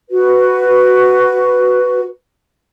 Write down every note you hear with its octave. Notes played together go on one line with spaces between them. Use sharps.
F#4 B4